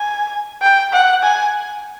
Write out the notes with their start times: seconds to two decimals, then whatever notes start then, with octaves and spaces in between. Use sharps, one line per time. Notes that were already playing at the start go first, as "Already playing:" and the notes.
Already playing: G#5
0.62 G5
0.92 F#5
1.23 G#5